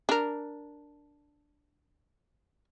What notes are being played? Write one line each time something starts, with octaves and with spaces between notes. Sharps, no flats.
D4 A#4